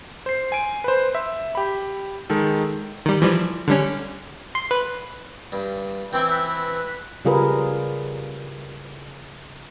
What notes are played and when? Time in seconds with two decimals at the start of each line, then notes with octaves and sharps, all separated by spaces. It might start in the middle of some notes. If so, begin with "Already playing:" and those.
0.26 C5 C7
0.52 G#5 D7
0.84 B4 C5
1.15 E5
1.55 G4 B5
2.30 D#3 G#3 A4
3.06 D#3 G3
3.22 E3 F3 G3
3.68 D3 G3 C#4
4.55 C6
4.71 B4
5.52 G2
6.13 E3 C4 E4 G5
6.31 B4
7.25 C#3 G3 F4 G#4 A#4 B4